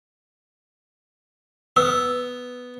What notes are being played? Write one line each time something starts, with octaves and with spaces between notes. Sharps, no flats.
B3 B4 D#6 E6